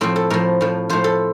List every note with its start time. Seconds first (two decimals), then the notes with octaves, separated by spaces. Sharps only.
0.01 A2 F3 C4
0.16 A4
0.30 A2 F3 A#4
0.61 A2 F3
0.89 A2 F3 C5
1.04 A4